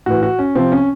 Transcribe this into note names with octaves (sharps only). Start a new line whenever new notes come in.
A2 E3 F#4
F#4
C#4
C3 F3 C4
C#4